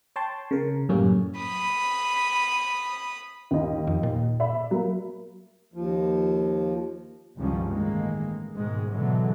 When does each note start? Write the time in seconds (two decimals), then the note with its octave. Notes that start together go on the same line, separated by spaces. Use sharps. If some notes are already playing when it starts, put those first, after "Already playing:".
0.16 C#5 G5 A5 C6
0.51 C#3 A#4
0.89 F#2 A2 G3 A3 A#3 C#4
1.38 B5 D#6
3.51 D#2 D#5
3.87 F2
4.03 A#2
4.40 D5 E5 B5
4.71 F#3 A#3
5.74 D#2 F3
7.37 F#1 C#2 G2 D#3 F3 C#4
7.67 A1 D#3 G#3 A#3
8.55 G#2 B2 D#3 G#3
8.90 B2 D3 E3 F#3 G#3